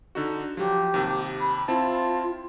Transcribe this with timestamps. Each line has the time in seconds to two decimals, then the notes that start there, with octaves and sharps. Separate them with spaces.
0.15 D3 D#4 F#4
0.57 F3 F#3 G4
0.94 D#2 C3
1.40 B5
1.68 C4 E4 F4 A5